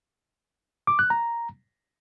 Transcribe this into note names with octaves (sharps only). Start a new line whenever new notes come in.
D6
F#6
A#5